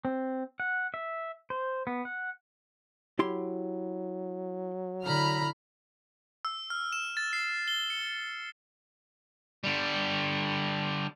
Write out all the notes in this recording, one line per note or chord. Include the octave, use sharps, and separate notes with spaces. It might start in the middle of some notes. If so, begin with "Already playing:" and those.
C4
F#5
E5
C5
B3
F#5
F#3 E4 G4 C6
D3 E4 A#5 B5 F6
E6
F6
E7
A6
C7
G7
C#7
D3 G3